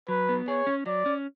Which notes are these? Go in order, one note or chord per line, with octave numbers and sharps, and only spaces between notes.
F#3 B4
B3
G#4 C#5
C#4
F#3 D5
C#4